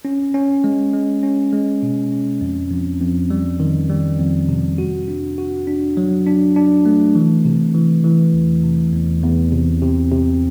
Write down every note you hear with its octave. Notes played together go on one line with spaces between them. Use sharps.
C#4
C#4
G#3
G#3
C#4
G#3
B2
C#4
F2
F2
F2
G3
D#3
G3
F2
C3
F#4
D4
F#4
D4
F#3
D4
D4
A3
E3
C3
E3
E3
E2
C3
E2
E2
C3
C3
C3